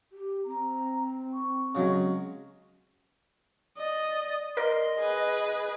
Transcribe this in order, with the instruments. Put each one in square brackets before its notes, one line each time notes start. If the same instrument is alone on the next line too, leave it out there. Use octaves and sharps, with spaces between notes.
[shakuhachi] G4
[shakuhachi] C4 [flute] A#5
[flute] C#6
[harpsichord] C#3 F#3 G#3
[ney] D5 [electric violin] D#5
[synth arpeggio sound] A#4 D5 [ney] D#5 [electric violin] C6
[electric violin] G#4 B4